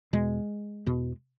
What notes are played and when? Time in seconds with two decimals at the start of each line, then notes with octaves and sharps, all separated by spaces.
0.13 E2 B2 G#3
0.86 E2 B2